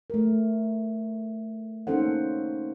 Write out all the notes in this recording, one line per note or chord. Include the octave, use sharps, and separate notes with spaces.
A3 A#4
A#3 C#4 D#4 A4 C5 F#5